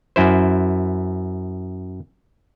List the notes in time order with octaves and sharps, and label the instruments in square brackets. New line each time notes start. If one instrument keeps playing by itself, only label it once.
[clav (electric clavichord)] F#2 E4 C5